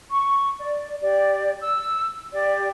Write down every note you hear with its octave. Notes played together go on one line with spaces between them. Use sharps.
C#6
D5
G4 D5
E6
G4 D5